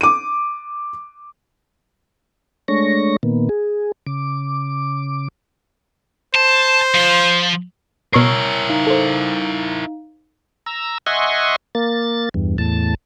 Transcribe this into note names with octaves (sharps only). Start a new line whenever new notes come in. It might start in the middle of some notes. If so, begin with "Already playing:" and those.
D6 D#7
G#3 A3 D4 C#5 C#6 A#6
A#2 D#3 A#3 B3
G#4
C#3 D6
C5 A5
F3
B2 E4 A#4 C#5 C#6 E6 F6 C7
D#4 F5
A4 C5
A#5 E6
D#5 E5 F#5 G#5 C6 C#6
A#3 A6
E2 G2
E2 A2 A5